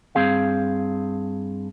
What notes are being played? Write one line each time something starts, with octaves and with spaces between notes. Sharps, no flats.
G2 C4 G#4 F5